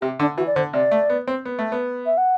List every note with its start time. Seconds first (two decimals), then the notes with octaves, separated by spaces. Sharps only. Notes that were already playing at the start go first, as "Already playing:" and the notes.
0.02 C3 G4
0.20 D3 D4
0.37 E3 F#4
0.47 D5
0.56 D3 C5
0.73 C3 D5
0.92 A3
1.10 B3
1.28 C4
1.45 B3
1.59 A3
1.72 B3
2.06 E5
2.17 F#5